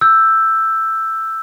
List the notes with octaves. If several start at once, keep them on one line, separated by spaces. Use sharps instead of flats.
E6 G6